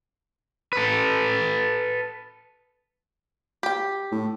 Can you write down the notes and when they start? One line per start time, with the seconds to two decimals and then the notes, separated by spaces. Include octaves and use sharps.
0.73 A4 B4
3.63 G4 G5
4.12 A2